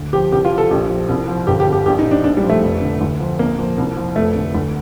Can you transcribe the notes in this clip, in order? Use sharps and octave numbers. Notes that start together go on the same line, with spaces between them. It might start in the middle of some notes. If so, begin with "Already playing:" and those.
Already playing: D2
F3 G4
C2 G4
F4
F3
A4
A#1 G4
F3
C2
F3
G1 G4
G4
D3
G4
A#1 G4
D#4
F3
D4
A#1 D4
G3
F3
A3
F1
D3
D2
F3
A#1 A#3
F3
C2
F3
F1 A3
D3
D2